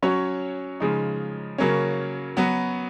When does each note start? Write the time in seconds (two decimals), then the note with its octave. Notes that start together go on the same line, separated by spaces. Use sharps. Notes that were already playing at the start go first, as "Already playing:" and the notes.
0.02 F#3 C#4 F#4 C#5
0.80 C#3 F3 G#3 D#4
1.58 C#3 F#3 A#3 C#4
2.37 F#3 B3 F#4